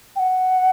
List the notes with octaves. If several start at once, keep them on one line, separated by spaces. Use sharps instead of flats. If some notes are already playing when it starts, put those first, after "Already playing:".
G5
F#5